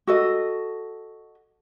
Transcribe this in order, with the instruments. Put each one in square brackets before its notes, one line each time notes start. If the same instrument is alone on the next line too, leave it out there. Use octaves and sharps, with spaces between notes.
[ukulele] F#4 A4 D#5